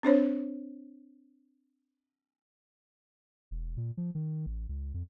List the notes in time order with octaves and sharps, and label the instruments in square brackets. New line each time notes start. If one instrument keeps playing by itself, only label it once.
[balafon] C4 D4 C5 C#5
[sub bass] E1
A#2
F3
D#3
A1
C#2
F2